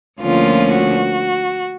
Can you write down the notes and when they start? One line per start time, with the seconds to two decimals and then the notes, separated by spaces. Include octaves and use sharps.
0.20 D2 D3 F3 A#3 C#4 F4
0.72 F#4